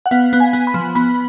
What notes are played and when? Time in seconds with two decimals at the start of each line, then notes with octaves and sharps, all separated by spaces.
0.06 F#5
0.11 B3 F5
0.33 B3
0.40 G#5
0.53 B3
0.67 B5
0.74 F3
0.95 B3 B5